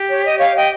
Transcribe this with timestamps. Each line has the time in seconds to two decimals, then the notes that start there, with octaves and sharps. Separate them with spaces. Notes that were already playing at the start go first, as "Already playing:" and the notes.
Already playing: G4
0.09 C#5
0.24 D#5
0.39 C#5 F5
0.55 D#5 G5